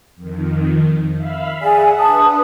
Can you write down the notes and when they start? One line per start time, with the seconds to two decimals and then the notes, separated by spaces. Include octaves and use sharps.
0.16 F2 D#3
1.16 E5 F5 B5
1.62 G#4 D5 E5 F#5 G#5
1.98 D4 B4 A5 D#6